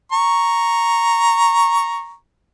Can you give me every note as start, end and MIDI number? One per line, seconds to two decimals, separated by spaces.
0.13 2.14 82
0.13 2.14 85